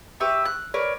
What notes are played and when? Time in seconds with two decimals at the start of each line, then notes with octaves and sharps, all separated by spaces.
0.20 G4 B4 E5 C#6
0.45 F#6
0.74 A#4 B4 C#5 D5